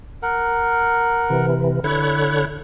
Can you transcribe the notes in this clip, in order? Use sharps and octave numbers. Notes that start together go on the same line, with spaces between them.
A#4 F#5
C3 E3
D3 E4 C#5 F#6